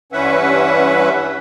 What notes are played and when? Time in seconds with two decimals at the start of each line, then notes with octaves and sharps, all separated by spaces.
0.12 G2 E3 C#4 B4 E5 F#5